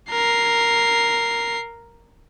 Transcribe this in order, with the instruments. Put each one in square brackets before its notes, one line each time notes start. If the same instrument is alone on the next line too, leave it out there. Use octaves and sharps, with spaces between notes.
[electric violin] A#4 C7